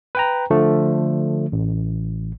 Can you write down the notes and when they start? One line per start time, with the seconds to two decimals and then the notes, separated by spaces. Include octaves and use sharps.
0.15 B4 G5 A#5
0.50 D3 F3 A3
1.52 A1